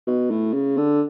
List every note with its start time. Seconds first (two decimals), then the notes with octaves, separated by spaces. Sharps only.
0.07 B2
0.30 A2
0.54 C#3
0.77 D3